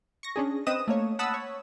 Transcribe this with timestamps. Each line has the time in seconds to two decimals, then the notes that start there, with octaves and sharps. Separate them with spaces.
0.23 C#6 A#6
0.36 C#4 D4 G#4
0.67 C4 B4 D#5 D#6 E7
0.88 A3 A#3 C#5
1.19 F#5 A5 B5 D#6 E6
1.34 C#5